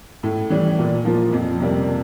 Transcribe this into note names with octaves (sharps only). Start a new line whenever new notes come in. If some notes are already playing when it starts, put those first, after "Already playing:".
A2
E3 G3
A#2
F3 A#3
F2
C3 G3 A#3